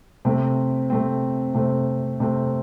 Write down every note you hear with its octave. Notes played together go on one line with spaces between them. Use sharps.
C3 A3 C4
C3 A3 C4
C3 A3 C4
C3 A3 C4